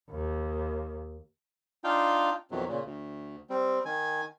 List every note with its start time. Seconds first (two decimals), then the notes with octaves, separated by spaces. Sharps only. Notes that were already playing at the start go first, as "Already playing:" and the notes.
0.10 D#2
1.84 D4 D#4 F4 F5 G5
2.51 F2 B2 D#3 E3 F#3 B3
2.68 A#2 C#3
2.85 D2
3.50 G3 C4
3.85 D#3 G#5